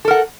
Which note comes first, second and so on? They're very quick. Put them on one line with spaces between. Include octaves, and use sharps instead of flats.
A4 A#4 F#5